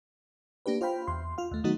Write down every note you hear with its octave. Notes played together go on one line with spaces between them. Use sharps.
A#3 D4 G4 B4
F4 C5 F5 G5 B5
E2 C6
F4 F5
D#2 A3
D#3 F#3 A3 B3 D#4 F#4